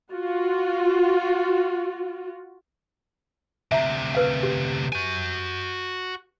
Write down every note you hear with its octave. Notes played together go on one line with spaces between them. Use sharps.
F4 F#4
D2 C3 E5 A#5
A#4 B4 F5
G4
F#4 G#5